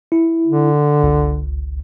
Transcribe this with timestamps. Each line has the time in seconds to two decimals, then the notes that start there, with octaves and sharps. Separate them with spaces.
0.12 E4
0.46 D3
1.03 G1 C#2